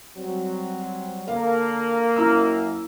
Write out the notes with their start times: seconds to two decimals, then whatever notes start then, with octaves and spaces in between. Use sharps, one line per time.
0.17 F#3 G3 C4
1.28 D3 A#3 A4 A#4 F5
2.16 F#2 E4 A#5 E6